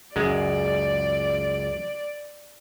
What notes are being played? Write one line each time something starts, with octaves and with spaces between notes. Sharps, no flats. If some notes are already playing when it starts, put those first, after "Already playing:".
C#2 F#2 G#3 D5